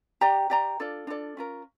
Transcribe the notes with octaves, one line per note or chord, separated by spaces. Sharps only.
G4 D5 G5 A#5
G4 D5 G5 A#5
D4 F4 A4 D5
D4 F4 A4 D5
C#4 F4 A#4